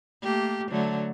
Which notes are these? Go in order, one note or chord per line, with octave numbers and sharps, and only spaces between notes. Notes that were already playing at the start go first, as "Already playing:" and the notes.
A3 A#3 G4
D3 F#3 A3